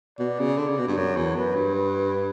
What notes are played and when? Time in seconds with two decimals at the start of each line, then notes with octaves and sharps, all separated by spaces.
0.19 B2 D5
0.39 C#3
0.58 D3
0.69 C#3
0.78 B2
0.87 G2
0.97 F#2 C#5
1.17 E2
1.35 F#2 B4
1.55 G2
1.75 B4